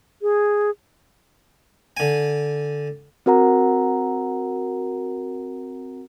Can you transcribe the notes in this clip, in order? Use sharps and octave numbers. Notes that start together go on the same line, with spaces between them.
G#4
D3 G#5
C4 F#4 A#4 F#5 A#5